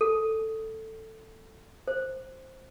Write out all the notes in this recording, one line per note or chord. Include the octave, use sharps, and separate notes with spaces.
A4
C5